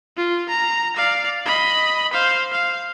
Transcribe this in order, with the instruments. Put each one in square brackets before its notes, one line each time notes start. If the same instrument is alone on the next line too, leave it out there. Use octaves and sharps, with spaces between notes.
[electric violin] F4
A#5
D5 F5
D#5 B5
C5 F5
F5